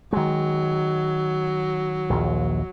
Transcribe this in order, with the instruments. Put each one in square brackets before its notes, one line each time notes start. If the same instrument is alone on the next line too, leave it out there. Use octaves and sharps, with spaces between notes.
[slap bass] D#3 G#3 [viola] F#3
[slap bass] A#1 D#2